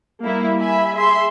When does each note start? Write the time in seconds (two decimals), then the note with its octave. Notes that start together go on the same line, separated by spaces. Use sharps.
0.23 G3 A#3 E4
0.61 G4 E5 G#5 B5
0.94 G#4 E5 C6